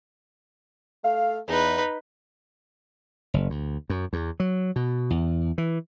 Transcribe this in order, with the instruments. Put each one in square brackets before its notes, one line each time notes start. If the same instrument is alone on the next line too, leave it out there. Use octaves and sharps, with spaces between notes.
[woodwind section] A3 F5
[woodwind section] E2 [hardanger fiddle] D#4 B4
[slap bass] F#1
D2
F#2
E2
F#3
B2
E2
E3